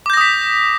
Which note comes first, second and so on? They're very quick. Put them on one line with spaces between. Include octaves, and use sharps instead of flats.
D6 G6 A#6 D#6 B6